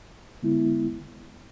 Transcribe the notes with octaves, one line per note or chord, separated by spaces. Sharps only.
D3 G#3 B3 E4